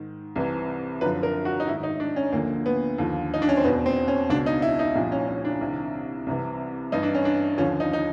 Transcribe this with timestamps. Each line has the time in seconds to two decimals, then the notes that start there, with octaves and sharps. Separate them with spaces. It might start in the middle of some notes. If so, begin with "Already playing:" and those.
Already playing: G#2 D#3
0.36 C2 C3 E3
1.01 F#2 D3 F3 B4
1.23 A#4
1.45 F#4
1.60 D#4
1.67 G#2 E4
1.72 D#3
1.83 D#4
2.00 D4
2.16 C#4
2.32 D2 D3 F3 A#3
2.66 B3
2.98 D#2 D3 F3
3.34 D#4
3.42 D4
3.49 C#4
3.57 C4
3.64 E2 B2 B3
3.86 C4
4.08 C#4
4.29 C#2 B2 D4
4.46 D#4
4.62 E4
4.79 D#4
4.95 C2 A#2 F3 D4
5.12 C#4
5.28 C#4
5.45 D4
5.61 C2 C3 D#3
6.26 C2 C3 E3
6.92 G2 E3 D#4
7.03 D4
7.14 C#4
7.25 D4
7.58 D#2 D3 F3 C#4
7.80 D#4
7.93 D#4